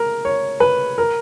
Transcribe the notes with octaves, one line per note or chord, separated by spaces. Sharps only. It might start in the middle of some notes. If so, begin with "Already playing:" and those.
Already playing: A#4
C#5
B4
A#4